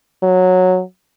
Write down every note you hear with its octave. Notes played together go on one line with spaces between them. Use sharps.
F#3